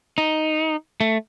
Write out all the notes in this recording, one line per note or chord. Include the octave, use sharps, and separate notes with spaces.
D#4
A3